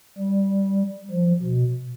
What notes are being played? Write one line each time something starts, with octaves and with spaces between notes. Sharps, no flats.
G3
F3
B2